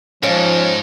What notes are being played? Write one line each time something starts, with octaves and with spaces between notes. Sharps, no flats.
G#2 F3 C#4 C#5 F5